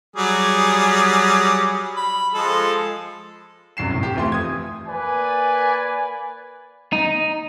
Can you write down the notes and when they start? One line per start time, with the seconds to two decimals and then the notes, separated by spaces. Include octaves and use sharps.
0.16 F#3 G3 G#4
1.96 B5
2.34 F3 G#3 A4
3.77 C2 F#2 C7 E7
3.90 A2
4.03 G4
4.15 F2 E3 A3 C6
4.32 D#6 G#6
4.88 A#3 B4 D5 G#5
6.93 D#4